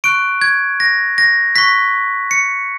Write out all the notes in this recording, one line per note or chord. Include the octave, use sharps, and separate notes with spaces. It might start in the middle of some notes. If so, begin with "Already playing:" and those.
C#6 F#6 D7
G#6
A#6
A#6
C#6 F#6 B6
C#7